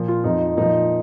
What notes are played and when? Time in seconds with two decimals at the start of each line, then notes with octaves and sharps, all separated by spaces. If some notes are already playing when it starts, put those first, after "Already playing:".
Already playing: A#2 F3
0.08 F4
0.24 F2 F3 D#4
0.57 A#2 F3 D#4